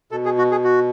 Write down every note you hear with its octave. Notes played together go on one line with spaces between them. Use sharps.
B2 A4
G#4
F#4
G#4
F#4